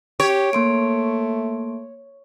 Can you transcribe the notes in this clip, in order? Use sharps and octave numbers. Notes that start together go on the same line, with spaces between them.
G4 C#5 D7
A3 A#3 C6 D7